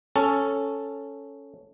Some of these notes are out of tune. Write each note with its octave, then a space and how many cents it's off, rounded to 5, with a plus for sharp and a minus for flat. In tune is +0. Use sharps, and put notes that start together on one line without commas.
C#4 +0 A4 +0